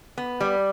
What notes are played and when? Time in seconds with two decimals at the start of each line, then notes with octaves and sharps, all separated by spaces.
0.18 B3
0.40 G3